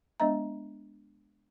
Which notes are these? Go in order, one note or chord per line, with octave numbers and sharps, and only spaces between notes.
G#3 B3 D4 D#5 E5 A#5